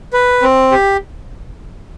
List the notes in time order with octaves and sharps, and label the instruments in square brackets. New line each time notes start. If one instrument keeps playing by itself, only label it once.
[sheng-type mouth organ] B4
C4
G4